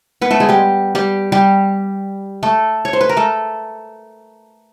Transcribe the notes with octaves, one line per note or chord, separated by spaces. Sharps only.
B3 B4
A3 A4
G#3 G#4
G3 G4
G3 G4
G3 G4
A3 A4
C#5
C5
B4
A#4
A3 A4